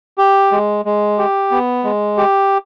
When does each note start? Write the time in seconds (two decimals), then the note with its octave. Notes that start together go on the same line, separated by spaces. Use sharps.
0.18 G4
0.52 G#3
0.85 G#3
1.18 G4
1.51 B3
1.84 G#3
2.17 G4